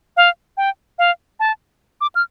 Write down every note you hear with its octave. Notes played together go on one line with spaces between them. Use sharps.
F5
G5
F5
A5
D6
F6